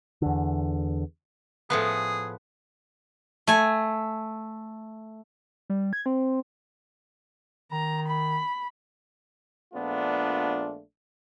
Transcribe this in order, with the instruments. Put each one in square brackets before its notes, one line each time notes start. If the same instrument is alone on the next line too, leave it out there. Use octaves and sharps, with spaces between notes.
[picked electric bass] E2 D3
[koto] A2 F3 B3 [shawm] G#4
[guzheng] A3 G#5
[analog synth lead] G3
G#6
C4
[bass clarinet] D#3 [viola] A#5
[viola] B5
[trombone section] A#1 A3 B3 D4 F4